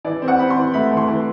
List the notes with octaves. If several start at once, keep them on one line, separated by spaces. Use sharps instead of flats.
E3 D5
C4
F#5
C4 B5
C6
E3
A3 B5
E3
C6
E3